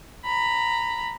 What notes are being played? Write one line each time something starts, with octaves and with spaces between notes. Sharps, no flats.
A#5 B5